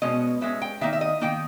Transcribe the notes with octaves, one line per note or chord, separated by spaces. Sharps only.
B2 G#3 C#4 D#5
B2 G#3 C#4 E5
G5
D#3 A#3 D#4 E5
E5
D#5
D#3 A#3 D#4 G5